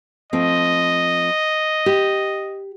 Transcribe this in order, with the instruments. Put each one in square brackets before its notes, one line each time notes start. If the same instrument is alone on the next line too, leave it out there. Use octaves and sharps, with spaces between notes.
[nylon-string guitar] F3 A3 C4 [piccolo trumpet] D#5
[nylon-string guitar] G4